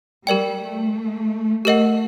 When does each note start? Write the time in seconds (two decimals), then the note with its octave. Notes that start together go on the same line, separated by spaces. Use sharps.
0.27 G3 G4 A#4 D5 G5
0.61 A3
1.65 A3 G4 A#4 D#5 F#5